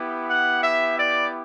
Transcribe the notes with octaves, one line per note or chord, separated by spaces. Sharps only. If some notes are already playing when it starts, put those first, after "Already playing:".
Already playing: B3 E4 G4
F#5
E5
D5